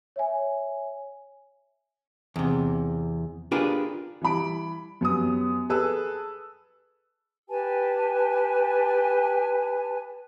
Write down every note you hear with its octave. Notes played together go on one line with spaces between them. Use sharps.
C#5 E5 G#5
E2 C3
D4 F4 G4 G#4 A#4 B4
E3 G3 B5 D7
F#2 B3 G4 D#6
G#4 A4 B4 E6
G4 B4 G#5 A5